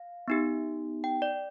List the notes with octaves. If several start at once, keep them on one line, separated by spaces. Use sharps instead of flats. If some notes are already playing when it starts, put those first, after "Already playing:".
Already playing: F5
B3 D#4 G4
G5
D5